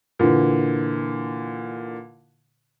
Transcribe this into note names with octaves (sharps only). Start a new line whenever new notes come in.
A#2 D3 E3